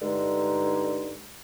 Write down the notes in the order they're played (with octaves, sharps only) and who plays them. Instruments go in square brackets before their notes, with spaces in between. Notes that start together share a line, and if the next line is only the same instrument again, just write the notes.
[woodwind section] G2 D3 G#3 D#4